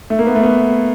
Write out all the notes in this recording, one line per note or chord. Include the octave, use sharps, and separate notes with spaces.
A3
A#3
B3
A3
B3